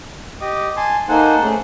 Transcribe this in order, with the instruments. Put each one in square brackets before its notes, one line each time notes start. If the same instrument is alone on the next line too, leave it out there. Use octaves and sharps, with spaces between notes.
[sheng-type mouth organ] G4 D#5
G#5 A5 C6
[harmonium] A#3 D#4 G#5 [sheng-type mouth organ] A4 C5 F#5
[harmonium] A3 C#4 G#4